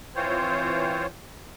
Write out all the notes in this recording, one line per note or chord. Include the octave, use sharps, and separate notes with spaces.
E3 C4 F4 C5 C#5